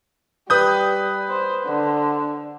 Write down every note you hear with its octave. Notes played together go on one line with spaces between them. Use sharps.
G3 B4 D#6 G6
C5
D3